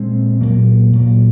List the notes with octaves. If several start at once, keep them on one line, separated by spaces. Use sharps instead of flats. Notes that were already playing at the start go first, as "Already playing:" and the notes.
Already playing: A#2 G#3 C4
A#2 F#3 A#3
A#2 F#3 A#3